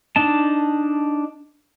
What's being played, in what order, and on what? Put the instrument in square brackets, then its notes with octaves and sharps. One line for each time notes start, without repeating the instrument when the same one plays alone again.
[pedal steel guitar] D4 D#4 A5